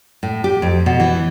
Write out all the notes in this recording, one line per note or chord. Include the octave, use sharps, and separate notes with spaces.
A2
G4
F2
B2
E3